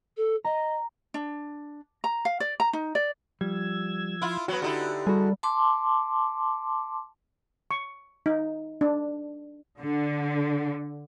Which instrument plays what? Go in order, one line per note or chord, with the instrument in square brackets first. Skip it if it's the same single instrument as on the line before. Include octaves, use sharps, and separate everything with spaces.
[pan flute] A4
[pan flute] D#5 [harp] A#5
[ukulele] D4
A#5
F5
D5
A#5
D#4
D5
[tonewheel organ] F3 E6 G#6 [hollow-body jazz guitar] G3
[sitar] E4 F4
[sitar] F#3 B3 [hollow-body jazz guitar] F#4
[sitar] D3 D#4 E4 [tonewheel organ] G4
[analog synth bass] G3 [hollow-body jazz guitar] F#4 G#4 [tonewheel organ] A4
[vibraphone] A5 C6 D6
[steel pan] C#6
D#4
D4
[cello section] D3